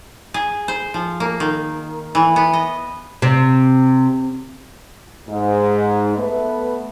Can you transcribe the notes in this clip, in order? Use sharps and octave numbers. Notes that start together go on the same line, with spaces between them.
G#4
C5
F3
A#3
D#3
E3
B3
D#5
C3
G#2
A3 B3 B4